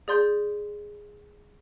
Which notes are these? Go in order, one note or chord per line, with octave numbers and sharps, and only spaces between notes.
G#4 D5 C6 G6